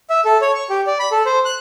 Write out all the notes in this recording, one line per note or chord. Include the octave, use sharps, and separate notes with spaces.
E5
A4
C#5
C#6
G4
D5
B5
A4
C5
F#6